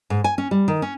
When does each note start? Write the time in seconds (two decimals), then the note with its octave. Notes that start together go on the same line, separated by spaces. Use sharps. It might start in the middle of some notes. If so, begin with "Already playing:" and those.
0.10 G#2
0.24 G#5
0.38 C#4
0.51 G3
0.68 D#3
0.82 C#4